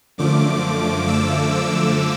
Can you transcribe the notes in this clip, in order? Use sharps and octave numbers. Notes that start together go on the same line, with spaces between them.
F#2 D3 F3 A3 D6
E6
E6